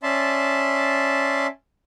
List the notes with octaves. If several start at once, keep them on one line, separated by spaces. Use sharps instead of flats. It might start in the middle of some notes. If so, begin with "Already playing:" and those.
C#4 D5 E5 A5 C6